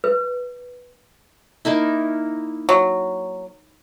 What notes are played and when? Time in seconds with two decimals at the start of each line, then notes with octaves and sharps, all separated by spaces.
0.04 B4
1.65 A#3 D#4 E4
2.69 F#3